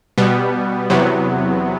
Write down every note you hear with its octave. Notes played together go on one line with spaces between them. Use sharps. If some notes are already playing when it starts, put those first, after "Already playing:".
B2 G3 B3
E2 C3 F#3 B3